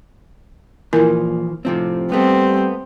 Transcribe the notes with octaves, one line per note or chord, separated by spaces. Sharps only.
A#2 E3 F3 E4 A#4 G#5
A2 C3 F3 C4
G3 A3 B3 C4